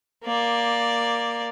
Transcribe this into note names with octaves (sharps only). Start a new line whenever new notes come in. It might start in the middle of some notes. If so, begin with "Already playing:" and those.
A#3 D5